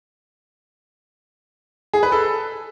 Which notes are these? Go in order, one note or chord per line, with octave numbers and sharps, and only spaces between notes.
G#4
B4
A4